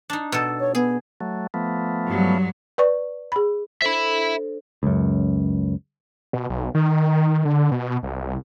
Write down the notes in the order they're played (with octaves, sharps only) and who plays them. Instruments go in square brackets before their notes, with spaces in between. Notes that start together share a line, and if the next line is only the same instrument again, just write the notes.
[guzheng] D4 D#4
B2 A4
[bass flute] C#5
[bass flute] B3 [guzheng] G#4
[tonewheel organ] F#3 A3
F3 A3 B3
[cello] G2 F#3
[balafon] B4 D5 C#6
G#4 B5
[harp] D4 A4 C5 [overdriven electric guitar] E5 B5
[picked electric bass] C#2 F#2
[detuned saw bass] B2
B1
D#3
D3
B2
C2